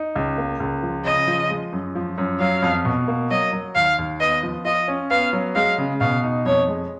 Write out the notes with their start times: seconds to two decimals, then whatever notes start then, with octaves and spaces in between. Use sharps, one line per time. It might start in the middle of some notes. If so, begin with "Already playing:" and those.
Already playing: D#4
0.15 C#2
0.38 A#3
0.60 C#2
0.83 F3
1.05 C#3 D#5
1.27 F3
1.50 G#3
1.73 F#2
1.95 F3
2.18 F#2
2.40 F#3 F5
2.62 F2
2.85 B2
3.08 A#3
3.31 F#3 D#5
3.53 F#3
3.75 D#2 F5
3.98 D#2
4.20 B3 D#5
4.43 F3
4.65 F4 D#5
4.88 C#4
5.10 B3 F5
5.33 F#3
5.55 G#3 F5
5.78 C#3
6.00 B2 F5
6.24 D#4
6.46 F2 C#5
6.68 G#3